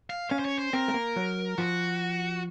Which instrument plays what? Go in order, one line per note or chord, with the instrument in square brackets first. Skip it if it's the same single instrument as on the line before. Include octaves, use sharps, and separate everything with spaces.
[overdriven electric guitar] F5
[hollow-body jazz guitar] C#4 [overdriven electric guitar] F5
[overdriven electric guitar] C5
C#5
C5
[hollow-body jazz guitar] C4 [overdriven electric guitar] A#4
[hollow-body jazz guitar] A3
A#3
F#3
[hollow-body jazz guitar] F3 [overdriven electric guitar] F#4